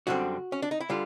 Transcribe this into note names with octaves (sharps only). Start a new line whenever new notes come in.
F#2 D3 G3 C4 F#4
C#4
D4
D#4
E4
D3 G3 F4